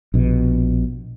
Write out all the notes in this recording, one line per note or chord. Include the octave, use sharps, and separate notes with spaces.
A#1 B2